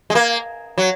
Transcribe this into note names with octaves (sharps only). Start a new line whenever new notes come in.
G#3
A#3
F#3